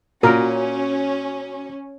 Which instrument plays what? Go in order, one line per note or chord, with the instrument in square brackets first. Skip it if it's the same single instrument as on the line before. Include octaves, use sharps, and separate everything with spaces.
[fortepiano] A#2 [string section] C#4 [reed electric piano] F#4 [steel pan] A#4